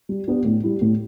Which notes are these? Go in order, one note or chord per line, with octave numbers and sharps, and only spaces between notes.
G3
B3 D4 G4
A2
G3 E4
A2